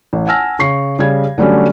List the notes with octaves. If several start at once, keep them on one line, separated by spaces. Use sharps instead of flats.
A1
F#5 G#5 A5 E6 F6 A#6
C#3 C#6 C7
C#3 G3 G#6
D3 F#3 G3 A3 C#4